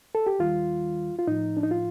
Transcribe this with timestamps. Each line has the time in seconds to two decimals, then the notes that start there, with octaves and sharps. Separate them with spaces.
0.15 A4
0.27 G4
0.39 D#2 D#3 G3 F4
1.19 F4
1.27 A2 F3 D#4
1.57 D4
1.63 D#4
1.71 F4